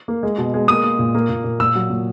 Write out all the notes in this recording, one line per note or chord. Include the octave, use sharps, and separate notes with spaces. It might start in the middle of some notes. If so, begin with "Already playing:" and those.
A#3
G#3
B2
G#3
A#3 D#6
A#3
A#2
A#3
A#2
A#2
A#2 E6
F#3
A#2